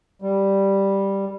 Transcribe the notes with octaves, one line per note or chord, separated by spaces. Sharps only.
G3